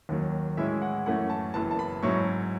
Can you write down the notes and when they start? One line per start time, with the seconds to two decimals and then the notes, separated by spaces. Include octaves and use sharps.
0.09 D#2 D#3 F#3
0.57 A2 E3 G#3 C#4 E4 E5
0.82 F#5
1.06 F#2 E3 A3 C#4 F#5
1.30 A5
1.54 F#1 F#2 E3 B3 A5
1.71 A5
1.79 B5
2.02 G#2 F#3 C#4 E4 C#6